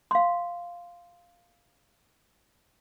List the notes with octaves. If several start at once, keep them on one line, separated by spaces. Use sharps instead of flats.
F5 C6